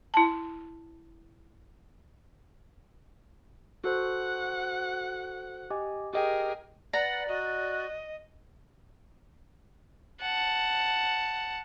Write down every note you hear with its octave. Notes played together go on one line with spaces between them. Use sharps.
E4 A5
F#4 A4 C5 F#5
G4 D#5 G#5
G4 G#4 A#4 D#5 G5
B4 D5 F#5 A#5
F#4 D#5
F#5 A5